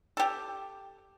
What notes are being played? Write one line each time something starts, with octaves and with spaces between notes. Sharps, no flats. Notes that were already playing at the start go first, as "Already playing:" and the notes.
G4 A4